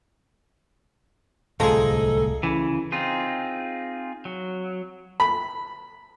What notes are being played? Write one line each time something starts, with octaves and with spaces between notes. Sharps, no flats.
D1 C2 F3 G#3 A3 G#4 A4 A#5
C#3 E3
C4 D#4 F4 G#4
F#3
B5